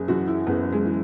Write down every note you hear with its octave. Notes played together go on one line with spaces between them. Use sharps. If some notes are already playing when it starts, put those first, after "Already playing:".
Already playing: F#1 G#4
F#2 E3 F#4
E4
F#1 B3
G#3
E3